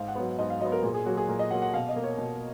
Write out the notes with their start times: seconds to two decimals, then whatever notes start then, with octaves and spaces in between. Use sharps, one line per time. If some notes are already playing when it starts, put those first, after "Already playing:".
Already playing: G#2 F5
0.08 F#5
0.15 F#3 B3
0.39 G#2 D#5
0.50 F5
0.61 F#3 B3 D#5
0.72 A#4
0.83 A#2 G#4
0.94 G#4
1.06 F#3 A#3 F#4
1.17 G#4
1.28 A#2 A#4
1.39 D#5
1.51 F#3 A#3 F#5
1.62 F#5
1.73 B2 F5
1.89 D#5
1.96 A#3
2.03 C#5
2.18 B2